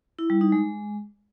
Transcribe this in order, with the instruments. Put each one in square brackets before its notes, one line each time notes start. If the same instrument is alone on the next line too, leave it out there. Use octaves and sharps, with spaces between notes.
[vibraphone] E4
G3
D#4
G#3